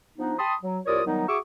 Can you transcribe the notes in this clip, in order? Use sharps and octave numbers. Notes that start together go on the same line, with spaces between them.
F3 B3 D4 D#4
G5 A5 B5 C6 D#6
F#3
C2 F4 A#4 C#5 D5 D#6
D#3 F#3 G3 B3 D#4
F#4 G#4 E5 C#6 D6 E6